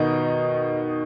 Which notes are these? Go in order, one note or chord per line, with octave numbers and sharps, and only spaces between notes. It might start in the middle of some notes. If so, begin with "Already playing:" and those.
Already playing: B2 D#3 B3 D#4